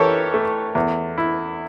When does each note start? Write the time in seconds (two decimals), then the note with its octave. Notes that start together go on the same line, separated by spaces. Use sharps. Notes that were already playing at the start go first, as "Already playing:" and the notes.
Already playing: E3 G4 A4 A#4 C#5
0.34 A3
0.75 E2
1.18 E4